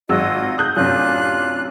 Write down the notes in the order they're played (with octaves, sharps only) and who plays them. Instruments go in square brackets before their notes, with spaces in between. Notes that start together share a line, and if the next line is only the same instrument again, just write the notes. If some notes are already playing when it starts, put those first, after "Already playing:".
[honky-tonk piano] G#1 F#3 E6 [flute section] F4 F#4 D#5
[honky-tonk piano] D#6 F#6 G6
[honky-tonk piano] F#2 A2 C3 [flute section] D4 F4 F#6